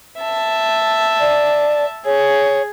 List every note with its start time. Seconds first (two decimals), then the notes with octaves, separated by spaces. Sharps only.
0.20 E5 A5
1.20 D5
2.05 G#4 C#5